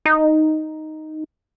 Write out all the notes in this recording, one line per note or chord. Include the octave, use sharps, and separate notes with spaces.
D#4